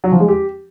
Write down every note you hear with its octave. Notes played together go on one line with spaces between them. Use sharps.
F#3
F3
G#3
G4